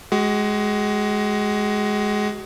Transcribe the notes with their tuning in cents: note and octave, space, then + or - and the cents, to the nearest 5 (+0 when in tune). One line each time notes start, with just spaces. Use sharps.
G#3 +10 F#4 +40